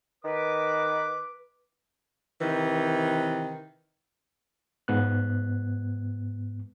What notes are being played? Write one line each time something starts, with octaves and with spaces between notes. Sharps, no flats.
D#3 B4 D6
C3 D#3 E3
G#2 B3 F#6